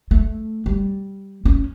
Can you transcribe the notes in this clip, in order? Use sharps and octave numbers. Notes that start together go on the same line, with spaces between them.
A3
G3
C#4